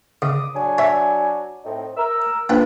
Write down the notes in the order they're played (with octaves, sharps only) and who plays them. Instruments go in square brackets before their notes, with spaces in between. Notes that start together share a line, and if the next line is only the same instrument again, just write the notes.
[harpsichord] C#3 [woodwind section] D6 D#6
[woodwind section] F#3 D4 G#5
[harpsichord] C#5 E5
[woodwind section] A2 C4 D#4
A#4 E6
[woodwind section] G#2 [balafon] A#3 D4 F4 [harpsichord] B4 G5